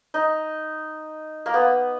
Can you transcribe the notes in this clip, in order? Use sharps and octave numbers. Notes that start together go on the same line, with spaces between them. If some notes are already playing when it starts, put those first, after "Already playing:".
D#4
A#3
B3